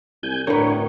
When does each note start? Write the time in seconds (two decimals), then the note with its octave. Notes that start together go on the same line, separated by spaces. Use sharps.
0.23 C2 G#5 G6
0.47 D2 A2 D3 A#4 B4 C#5